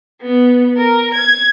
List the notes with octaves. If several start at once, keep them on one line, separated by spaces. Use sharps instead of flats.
B3
A#4
G#6